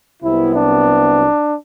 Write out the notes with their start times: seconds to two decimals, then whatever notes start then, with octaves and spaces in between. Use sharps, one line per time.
0.23 C2 C3 F#3 B3 E4
0.55 D4